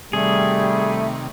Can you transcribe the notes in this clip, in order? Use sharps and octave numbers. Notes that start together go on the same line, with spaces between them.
C3 D#3 G3 A3 G#4